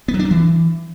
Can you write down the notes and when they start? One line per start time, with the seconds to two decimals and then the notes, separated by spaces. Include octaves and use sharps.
0.08 B3
0.14 F#3
0.20 D4
0.25 F#3
0.31 E3